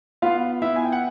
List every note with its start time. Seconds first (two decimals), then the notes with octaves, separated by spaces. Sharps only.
0.22 B3 F4 F5
0.62 B3 E4 E5
0.76 G#5
0.85 G5
0.92 F#5